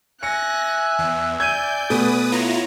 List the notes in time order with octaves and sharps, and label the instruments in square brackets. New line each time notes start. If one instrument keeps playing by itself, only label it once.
[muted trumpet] E5 [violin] G#5 F#6 [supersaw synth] A#6 [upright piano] C#7
[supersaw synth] E2
[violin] D5 G#5 [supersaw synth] G6 [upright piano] G#6 D#7
[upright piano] B2 A3 [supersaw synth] B4 D#6
[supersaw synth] E4 F4 A#5 [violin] C#5